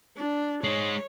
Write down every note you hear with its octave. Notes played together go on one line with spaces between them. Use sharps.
D4
G#3 D#4 C#5